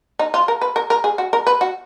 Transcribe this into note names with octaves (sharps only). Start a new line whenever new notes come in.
D#4
F4
A#4
B4
A#4
A#4
G#4
F#4
A#4
B4
F#4